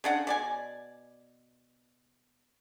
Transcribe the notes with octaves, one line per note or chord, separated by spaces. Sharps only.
C#3 D4 F#5
B2 D5 G#5